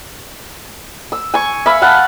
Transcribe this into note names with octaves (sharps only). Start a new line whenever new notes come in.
E6
G#5 C#6
E5 F5 B5
F5 F#5 A5 B5